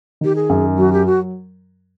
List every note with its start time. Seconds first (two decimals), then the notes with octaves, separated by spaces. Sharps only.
0.21 D#3 G4
0.36 G#4
0.50 F#2
0.77 F#3 F#4
0.93 G4
1.06 F#4